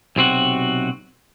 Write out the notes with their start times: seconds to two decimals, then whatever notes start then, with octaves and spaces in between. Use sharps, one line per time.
0.16 B1 C3 C4 F#4